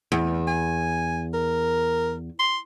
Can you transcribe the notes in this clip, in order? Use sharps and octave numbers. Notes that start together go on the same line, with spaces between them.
E2
G#5
A#4
C6